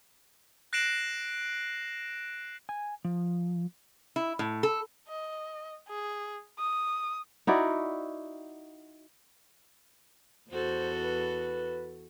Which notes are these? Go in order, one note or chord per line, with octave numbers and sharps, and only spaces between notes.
F#6 A#6 C7 D7 E7 F#7
G#5
F3
E4
A2
A4
D#5
G#4
D#6
D#4 E4 F#4 D5
E2 F#4 A4 C5
B4